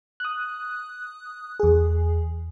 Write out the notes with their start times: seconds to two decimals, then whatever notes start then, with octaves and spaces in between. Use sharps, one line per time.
0.20 D#6 F#6
1.60 E2 G#4